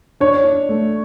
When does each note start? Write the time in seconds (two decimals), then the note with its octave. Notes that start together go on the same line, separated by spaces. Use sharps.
0.20 D4 C#5
0.44 D4
0.69 A3